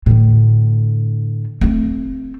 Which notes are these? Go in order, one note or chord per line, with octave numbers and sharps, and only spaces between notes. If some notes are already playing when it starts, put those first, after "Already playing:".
A2 D3
A3 C4